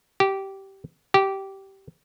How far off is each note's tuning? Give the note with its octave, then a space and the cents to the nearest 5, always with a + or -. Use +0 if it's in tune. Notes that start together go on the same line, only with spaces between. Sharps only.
G4 -15
G4 -15